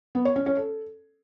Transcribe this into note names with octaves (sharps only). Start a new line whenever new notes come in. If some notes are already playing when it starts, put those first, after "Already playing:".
B3
C#5
C#4
C#4
A4